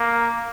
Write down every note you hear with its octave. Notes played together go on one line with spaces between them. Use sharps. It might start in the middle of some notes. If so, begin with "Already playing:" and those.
Already playing: A#3